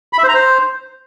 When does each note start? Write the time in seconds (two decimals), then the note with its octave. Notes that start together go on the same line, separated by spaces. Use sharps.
0.13 B5
0.18 E5
0.23 C5
0.29 A#5
0.34 C5